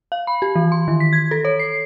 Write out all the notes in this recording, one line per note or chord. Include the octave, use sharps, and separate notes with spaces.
F5
B5
G4
E3
C6
D#3
B6
G#6
A4
C#5
C7